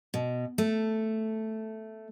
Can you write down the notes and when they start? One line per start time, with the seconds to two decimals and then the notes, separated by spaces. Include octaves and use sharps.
0.14 B2
0.58 A3